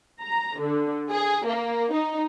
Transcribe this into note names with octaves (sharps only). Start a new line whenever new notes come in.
A#5
D3
G#4
A#3
D#4